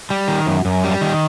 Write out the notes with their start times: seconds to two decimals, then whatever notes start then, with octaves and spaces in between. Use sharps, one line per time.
0.10 G3
0.28 D#3
0.46 F#2
0.65 F#2
0.84 G3
1.01 D#3